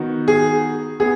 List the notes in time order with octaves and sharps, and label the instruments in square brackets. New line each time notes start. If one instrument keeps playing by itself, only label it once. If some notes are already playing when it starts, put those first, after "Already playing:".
Already playing: [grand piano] D#3 B3 D#4 F#4
[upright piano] G#4
[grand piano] B3 [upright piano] G#4